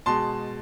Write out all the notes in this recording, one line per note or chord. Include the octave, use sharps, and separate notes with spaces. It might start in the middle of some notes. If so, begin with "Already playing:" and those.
B2 G#3 A5 C6